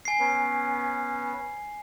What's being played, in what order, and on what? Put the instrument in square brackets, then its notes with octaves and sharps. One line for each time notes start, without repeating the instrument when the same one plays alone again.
[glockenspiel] G#5 C7
[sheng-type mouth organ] B3 C#4